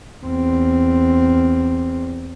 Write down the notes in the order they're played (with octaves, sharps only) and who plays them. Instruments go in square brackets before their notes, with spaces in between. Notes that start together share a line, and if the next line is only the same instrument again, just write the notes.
[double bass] E2 C4